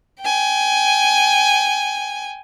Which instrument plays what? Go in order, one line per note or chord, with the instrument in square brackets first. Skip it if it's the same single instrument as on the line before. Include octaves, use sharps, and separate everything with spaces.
[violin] G5 G#5